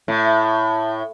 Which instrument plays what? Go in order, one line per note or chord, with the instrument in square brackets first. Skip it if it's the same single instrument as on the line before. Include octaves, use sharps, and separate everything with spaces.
[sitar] A2